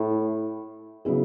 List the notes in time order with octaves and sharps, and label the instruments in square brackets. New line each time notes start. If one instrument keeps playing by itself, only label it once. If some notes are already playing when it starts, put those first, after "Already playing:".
Already playing: [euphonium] A2
[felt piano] C#3 F#3 B3 E4 G#4